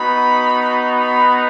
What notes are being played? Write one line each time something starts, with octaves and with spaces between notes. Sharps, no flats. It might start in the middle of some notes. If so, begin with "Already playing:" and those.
Already playing: B3 D#4 F#4 B5
B5